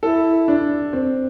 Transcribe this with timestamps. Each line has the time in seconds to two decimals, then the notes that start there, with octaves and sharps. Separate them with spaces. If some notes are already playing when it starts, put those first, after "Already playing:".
0.03 E4 A4
0.48 D4
0.93 C4